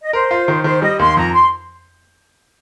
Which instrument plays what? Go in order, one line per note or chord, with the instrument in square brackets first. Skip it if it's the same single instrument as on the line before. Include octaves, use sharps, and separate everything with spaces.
[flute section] D#5
[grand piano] A#4 [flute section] C5
[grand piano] F4
D#3
[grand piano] D#3 [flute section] C5
[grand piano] G3 [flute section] D#5
[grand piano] D#2 [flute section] C6
[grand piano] F2 [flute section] A#5
[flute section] C6